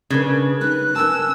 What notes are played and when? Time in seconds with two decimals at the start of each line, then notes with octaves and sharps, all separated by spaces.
0.10 C#3 D4 A#4 B4
0.61 D#4 B4 C#5 F#6
0.96 C#4 A#4 A5 E6